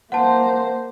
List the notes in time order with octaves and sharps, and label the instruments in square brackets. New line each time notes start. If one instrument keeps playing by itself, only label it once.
[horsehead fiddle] A#3 C5 [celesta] F#5 A5